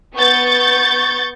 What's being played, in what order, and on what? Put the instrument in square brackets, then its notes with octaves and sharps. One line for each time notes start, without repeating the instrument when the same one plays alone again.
[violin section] B3 C#6 G6 A6